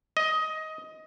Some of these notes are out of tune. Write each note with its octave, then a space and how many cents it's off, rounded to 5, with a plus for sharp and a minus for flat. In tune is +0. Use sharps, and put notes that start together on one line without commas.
D#5 +15